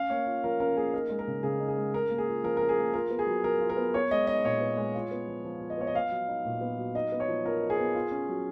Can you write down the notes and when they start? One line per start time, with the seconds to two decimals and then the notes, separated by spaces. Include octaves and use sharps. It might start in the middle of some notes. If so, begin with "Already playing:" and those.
Already playing: C#4 F5
0.10 A#3 C#5
0.26 F4
0.44 F3 A#4
0.60 C#4 A#4
0.76 A#3 G#4
0.93 D#4 A#4
1.10 G#3
1.19 A#4
1.27 C#3
1.43 C#3 G#4
1.60 D#4
1.68 G#4
1.76 G#3
1.94 C#4 A#4
2.10 A#3
2.18 G#4
2.28 F4
2.44 F3 A#4
2.57 C#4 A#4
2.69 G#4
2.78 A#3
2.94 F4 A#4
3.10 B3
3.19 G#4
3.27 F#3
3.44 F#3 A#4
3.60 F4
3.70 A#4
3.77 B3
3.94 B3 C#5
4.11 G#3 D#5
4.27 D#4 D#5
4.44 A#2 C#5
4.61 B3
4.77 G#3
4.95 F4
5.11 B3
5.28 F3
5.45 F3
5.61 F4
5.70 D#5
5.78 B3 C#5
5.87 D#5
5.94 B3 F5
6.11 F#3
6.28 D#4
6.45 A#2
6.61 B3
6.78 F#3
6.95 D#4 D#5
7.12 B3
7.20 C#5
7.28 F3
7.44 F3 A#4
7.62 D#4
7.70 G#4
7.79 B3
7.95 F4
8.11 C#4
8.29 F#3